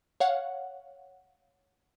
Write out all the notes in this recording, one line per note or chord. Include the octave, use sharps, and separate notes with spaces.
C#5 F5 F#5